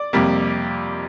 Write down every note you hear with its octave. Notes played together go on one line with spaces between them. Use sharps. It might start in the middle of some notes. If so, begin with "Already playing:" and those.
Already playing: D5
F2 C3 G3 A#3